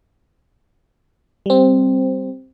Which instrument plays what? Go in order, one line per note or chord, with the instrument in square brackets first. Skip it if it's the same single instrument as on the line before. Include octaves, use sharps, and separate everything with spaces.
[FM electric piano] G3 C4